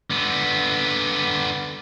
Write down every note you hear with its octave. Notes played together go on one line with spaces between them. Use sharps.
D3 B3